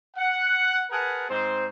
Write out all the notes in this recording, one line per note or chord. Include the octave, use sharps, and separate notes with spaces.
F#5
G#4 A#4 B4 F#5 G#5 A5
G#2 C4 D#4 C5